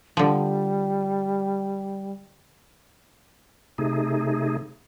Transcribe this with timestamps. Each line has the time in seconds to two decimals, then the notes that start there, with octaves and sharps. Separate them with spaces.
0.17 D3 F3 G3
3.78 C3 A3 D#4 G#4